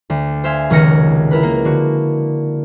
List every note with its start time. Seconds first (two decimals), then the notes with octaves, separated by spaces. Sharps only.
0.10 D2
0.44 C5 E5 F5 G#5 C6
0.70 F1 C#2 D#3 F6 A#6 C#7
1.31 E4 A#4 B4
1.43 A#3
1.64 D3 F#4